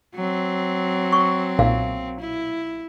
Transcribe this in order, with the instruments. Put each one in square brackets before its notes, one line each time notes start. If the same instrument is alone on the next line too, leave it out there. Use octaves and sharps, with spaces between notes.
[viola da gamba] F#3 C4
[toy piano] C#6
[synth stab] B1 A#2 [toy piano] E5 F5
[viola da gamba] E4